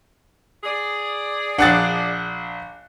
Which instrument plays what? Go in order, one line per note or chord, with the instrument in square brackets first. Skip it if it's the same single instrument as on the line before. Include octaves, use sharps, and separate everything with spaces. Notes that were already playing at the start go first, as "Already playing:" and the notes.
[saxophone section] G#4 D5
[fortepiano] A#1 D4 [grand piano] F#5 F#6 A6